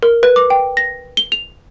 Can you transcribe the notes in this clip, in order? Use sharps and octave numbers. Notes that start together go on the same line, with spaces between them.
A#4
B4
D6
G5
A#6
G7
F7